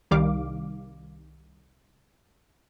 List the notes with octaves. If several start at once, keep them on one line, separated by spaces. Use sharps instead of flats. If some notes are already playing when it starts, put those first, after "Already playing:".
C2 D#3 G3 F5 D6